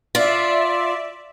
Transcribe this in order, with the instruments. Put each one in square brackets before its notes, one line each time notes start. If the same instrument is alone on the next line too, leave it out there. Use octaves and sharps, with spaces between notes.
[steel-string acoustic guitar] F4 [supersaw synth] D5 E5